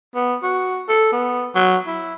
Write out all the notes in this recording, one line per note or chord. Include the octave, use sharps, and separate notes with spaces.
B3
F#4
A4
B3
F#3
E4